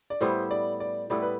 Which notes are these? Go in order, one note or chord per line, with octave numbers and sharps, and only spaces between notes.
D5
A2 G3 B3 E4 C5
D5
D5
A2 G3 B3 E4 D5
B4